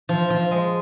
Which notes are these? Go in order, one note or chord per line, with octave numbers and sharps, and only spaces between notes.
F3
F3
G#3